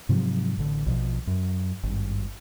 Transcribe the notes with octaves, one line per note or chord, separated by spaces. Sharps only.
G#2 C3 F3 F#3
A1 D3
A#1 B2 F3
F#2
G#1 G2